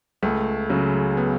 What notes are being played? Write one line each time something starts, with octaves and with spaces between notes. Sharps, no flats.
C#2 A3
C#3 F#3
B3